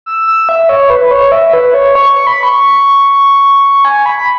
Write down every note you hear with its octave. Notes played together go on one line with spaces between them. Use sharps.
E6
E6
E5
C#5
B4
C#5
E5
B4
C#5
C#6
C#6
B5
C#6
G#5
B5
B5